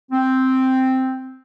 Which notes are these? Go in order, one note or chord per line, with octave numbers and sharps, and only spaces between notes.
C4